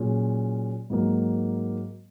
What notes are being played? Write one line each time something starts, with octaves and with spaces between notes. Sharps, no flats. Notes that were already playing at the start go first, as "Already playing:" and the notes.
Already playing: A#2 F#3 C#4 G#4
G#2 F#3 A#3